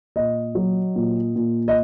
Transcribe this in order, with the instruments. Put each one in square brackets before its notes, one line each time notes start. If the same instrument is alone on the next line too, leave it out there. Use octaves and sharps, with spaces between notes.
[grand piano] A#2 D#5
F#3
A#2
A#2
D#5